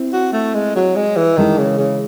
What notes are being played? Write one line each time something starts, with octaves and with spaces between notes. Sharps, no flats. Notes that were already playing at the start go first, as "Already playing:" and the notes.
Already playing: C4 E4 C5
F#4
A3
G#3
F#3
G#3
E3
D#3 E3 G#3 C#4 E4 A4
C#3
C#3